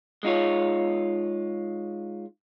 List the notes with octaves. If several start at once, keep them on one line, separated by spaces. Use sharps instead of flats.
G#3 D#4 F4 C#5